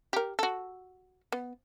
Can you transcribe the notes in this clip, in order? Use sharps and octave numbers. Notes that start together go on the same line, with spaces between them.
G4 A#4
F#4 A4
B3